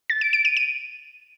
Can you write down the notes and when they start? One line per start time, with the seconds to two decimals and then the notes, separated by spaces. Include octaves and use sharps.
0.10 A6
0.21 D7
0.33 D7
0.45 D#7
0.57 D#7